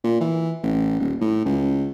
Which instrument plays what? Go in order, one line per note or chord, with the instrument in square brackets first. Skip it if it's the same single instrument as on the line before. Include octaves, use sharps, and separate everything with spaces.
[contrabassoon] A#2
E3
A1
D#1
A2
C#2